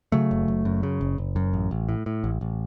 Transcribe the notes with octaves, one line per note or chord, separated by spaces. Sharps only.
C#3 F#3 A3
F#1
F#1
F#2
C#3
F#1
F#1
F#2
A1
A1
A2
A2
A1
A1